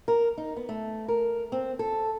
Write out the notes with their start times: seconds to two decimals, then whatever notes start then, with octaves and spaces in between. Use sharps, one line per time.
0.08 A#4
0.38 D#4
0.56 B3
0.69 A3
1.08 A#4
1.52 C4
1.79 A4